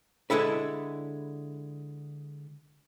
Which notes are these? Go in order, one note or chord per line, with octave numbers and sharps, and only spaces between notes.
D3 G#3 E4 A4 B4